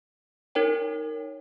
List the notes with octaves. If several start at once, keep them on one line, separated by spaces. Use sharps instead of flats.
D#4 A#4 C#5 G5